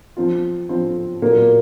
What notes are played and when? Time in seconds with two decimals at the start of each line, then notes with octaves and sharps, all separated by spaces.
0.17 F3 C4 F4
0.69 F3 C4 F4
1.22 A#2 F#3 A#3